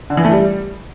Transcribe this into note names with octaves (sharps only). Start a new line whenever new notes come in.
D3
E3
A3
G3